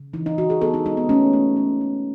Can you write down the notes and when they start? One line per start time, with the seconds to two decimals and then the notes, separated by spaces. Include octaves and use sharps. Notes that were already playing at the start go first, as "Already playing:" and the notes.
Already playing: C#3
0.13 E3 D#4
0.26 D#4
0.38 E3 F#4
0.50 G#4
0.61 B3 A4
0.74 D#4
0.85 G#3 D#4
0.97 B3
1.09 A3 C#4
1.33 A3
1.57 A3
1.81 A3